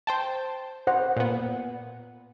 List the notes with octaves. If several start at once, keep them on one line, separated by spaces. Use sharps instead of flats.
C5 G5 A5
C5 F#5
A#2 B3